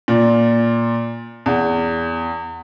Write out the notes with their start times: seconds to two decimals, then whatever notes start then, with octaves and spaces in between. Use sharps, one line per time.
0.08 A#2
1.46 E2